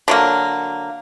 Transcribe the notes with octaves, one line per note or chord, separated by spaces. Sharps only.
D3 F#3 A#3